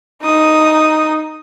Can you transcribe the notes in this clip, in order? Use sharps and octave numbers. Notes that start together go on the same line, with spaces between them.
D#4 D#6